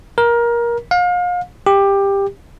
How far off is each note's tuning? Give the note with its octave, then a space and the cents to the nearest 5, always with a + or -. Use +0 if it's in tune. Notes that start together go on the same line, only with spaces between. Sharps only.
A#4 +20
F5 +35
G4 +15